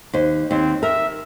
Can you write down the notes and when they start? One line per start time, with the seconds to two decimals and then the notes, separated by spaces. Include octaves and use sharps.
0.14 D#2 C5
0.51 D#2 C4
0.83 A#4 E5